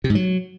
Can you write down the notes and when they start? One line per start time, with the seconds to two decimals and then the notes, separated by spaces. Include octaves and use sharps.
0.04 C3
0.10 G#2
0.15 F#3